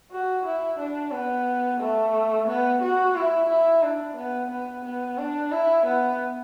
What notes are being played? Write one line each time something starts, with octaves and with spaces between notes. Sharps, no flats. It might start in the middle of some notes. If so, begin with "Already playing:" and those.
F#4
E4
D4
B3
A3
B3
F#4
E4
E4
D4
B3
B3
B3
D4
E4
B3